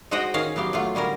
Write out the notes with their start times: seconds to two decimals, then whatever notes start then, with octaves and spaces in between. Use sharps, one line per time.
0.11 G#3 F#4 C5 D#5 F#5 G5
0.34 D#3 C#4 F5
0.56 F#3 B3 G4 F5
0.73 F#3 A3 F4
0.95 D3 G3 C#4 A#4